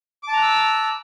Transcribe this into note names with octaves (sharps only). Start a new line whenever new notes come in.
A5 A#5 D6 E6 F#6